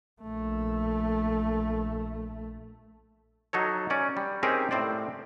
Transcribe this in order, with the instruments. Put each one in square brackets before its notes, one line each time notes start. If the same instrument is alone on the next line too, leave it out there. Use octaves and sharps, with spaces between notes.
[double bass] A#1 A3
[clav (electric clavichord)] F#3 D#4 A4 C#5
C#4 D5
G3
C4 C#4 D#4 G4 G#4 A#4
A2 C4 C5 D5